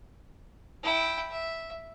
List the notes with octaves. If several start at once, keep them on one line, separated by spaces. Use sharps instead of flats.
E4 G5
E5